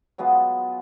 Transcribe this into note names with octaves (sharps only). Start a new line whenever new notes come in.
F#3 G#3 B3 F4